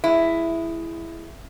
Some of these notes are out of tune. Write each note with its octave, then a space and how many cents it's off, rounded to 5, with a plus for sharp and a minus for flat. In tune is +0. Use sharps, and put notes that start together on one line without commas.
G#3 +0 E4 +10